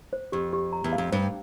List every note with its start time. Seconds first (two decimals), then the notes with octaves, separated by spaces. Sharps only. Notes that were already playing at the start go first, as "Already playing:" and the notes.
0.13 C5
0.32 F2 G4
0.53 G4
0.73 A#5
0.84 E2
0.93 F5
0.98 F2
1.12 G2 C5